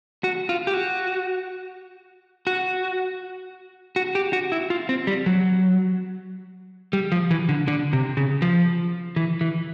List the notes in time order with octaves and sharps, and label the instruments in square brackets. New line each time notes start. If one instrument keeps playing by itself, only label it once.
[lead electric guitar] F#4
F4
G4
F#4
F#4
F#4
G4
F#4
E4
F4
C4
G3
F#3
G3
F3
E3
D3
D3
C3
C#3
F3
E3
E3